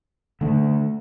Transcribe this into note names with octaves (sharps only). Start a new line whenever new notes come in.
D3 A3 D4